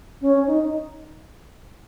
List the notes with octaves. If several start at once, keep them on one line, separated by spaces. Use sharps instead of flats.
C#4
D#4